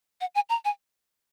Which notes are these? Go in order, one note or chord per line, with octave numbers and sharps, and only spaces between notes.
F#5
G#5
A#5
G#5